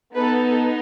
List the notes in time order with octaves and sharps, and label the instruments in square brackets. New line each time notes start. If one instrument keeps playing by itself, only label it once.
[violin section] B3 D#4 A4 B4